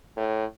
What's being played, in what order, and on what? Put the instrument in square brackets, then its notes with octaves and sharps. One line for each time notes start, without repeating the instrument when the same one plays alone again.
[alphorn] A2